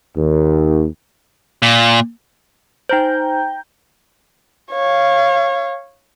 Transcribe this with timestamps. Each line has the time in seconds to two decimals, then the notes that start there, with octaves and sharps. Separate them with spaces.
0.17 D#2
1.62 A#2
2.89 D#4 C5 G5 A#5 G6
4.71 C#5 F5